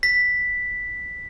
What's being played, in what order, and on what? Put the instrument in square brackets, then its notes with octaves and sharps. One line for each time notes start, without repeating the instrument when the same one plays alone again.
[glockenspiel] B6